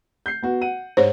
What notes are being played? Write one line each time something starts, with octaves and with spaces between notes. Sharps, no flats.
G6 C7
B3 F#4
F#5 D#7
G#2 C5 C#5